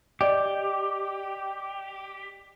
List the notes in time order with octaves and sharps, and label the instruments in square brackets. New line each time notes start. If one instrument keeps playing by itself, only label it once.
[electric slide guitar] G4 [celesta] D5 D#5